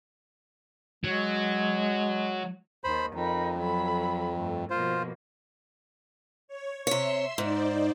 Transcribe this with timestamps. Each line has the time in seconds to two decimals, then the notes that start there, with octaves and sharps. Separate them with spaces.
1.04 F#3 G#3
2.84 D#2 D#3 C5 B5
3.14 F2 D#4 A#4 B5
3.58 F#3 A4 B5
4.33 G2 A3
4.70 B2 F3 A#3 F4 C5
6.48 C#5
6.87 C3 C#5 E5 C6 E6
7.38 G#2 D#4 C5 D5